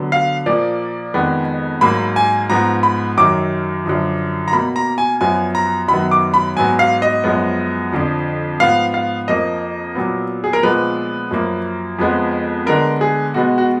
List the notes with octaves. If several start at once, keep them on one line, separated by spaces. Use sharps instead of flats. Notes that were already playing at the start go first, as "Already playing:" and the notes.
Already playing: D3 F#3 B3
F5
A#2 F3 A#3 D5
F2 D#3 G#3 B3
G#2 F#3 A#3 B5
G#5
G#2 F3 B3 A#5
B5
F#2 D#3 F#3 D6
F#2 D3 F3
A#5
B2 A#3 B5
A#5
G#5
F#2 F3 B3 G#5
A#5
F#2 D#3 F#3 B3 B5
D6
B5
G#2 F#3 B3 G#5
F5
D#5
F#2 F3 G#3 B3
F2 D3 F3
G#2 F3 B3 F5
F5
F2 F3 A#3 D#5
A#2 F#3 B3
G#4
A#4
A#2 F3 G#3 B3 B4
F#2 F3 A#3
F2 F3 G#3 B3
D3 G#3 B3 A#4
G#4
B2 G#3 B3 F#4
F#4